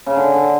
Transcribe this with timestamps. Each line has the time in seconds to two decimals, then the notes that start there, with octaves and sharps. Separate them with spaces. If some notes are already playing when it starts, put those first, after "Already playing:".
0.06 C#3
0.16 D3
0.34 D3